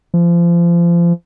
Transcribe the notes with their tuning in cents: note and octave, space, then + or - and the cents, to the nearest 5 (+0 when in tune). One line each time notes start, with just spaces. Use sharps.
F3 -30